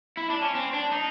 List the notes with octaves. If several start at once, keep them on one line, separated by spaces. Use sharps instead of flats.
E4
D4
C#4
C4
D4
D#4